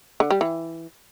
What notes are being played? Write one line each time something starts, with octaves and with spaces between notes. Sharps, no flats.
D3
G3
E3